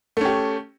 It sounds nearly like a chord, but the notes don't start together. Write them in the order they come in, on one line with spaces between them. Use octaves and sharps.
A3 C#4 G4